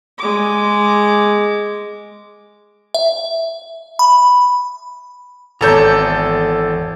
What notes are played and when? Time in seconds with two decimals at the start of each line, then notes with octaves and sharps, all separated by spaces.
0.19 G#3 D6
2.94 E5
3.99 B5
5.61 G#1 E2 A4 C#5 A#5 G6